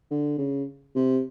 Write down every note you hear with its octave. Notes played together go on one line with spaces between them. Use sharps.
D3
C#3
C3